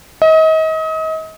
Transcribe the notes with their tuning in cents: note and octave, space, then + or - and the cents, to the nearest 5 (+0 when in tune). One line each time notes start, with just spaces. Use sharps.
D#5 +35